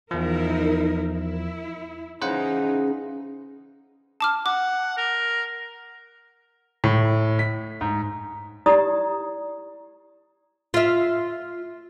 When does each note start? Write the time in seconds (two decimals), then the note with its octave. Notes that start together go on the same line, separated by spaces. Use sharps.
0.11 E2 F3 D#4 E4 A#4
1.11 E4
2.22 C#3 E3 D#4 C5 F#5
4.21 A5 D6 F6
4.46 F#5 D6
4.97 A#4
6.84 A2
7.39 B6
7.81 G#2
8.66 E4 G4 D5 A#5 D#6
10.74 F4 E5